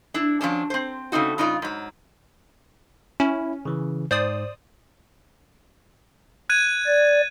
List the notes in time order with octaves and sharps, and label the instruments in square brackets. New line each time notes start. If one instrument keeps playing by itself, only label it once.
[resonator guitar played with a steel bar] D4 E4
F3 F#3 C#4 D4
C4 C5
C#3 A3 C4 D#4 F#4
G2 C#3 D#4 F4 D5
G#2 F#3
[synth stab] C#4 [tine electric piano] E4
[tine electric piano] C#3 E3
[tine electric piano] G#2 [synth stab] C5 D5 D#6
[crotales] F#6 G#6 D#7
[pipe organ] D5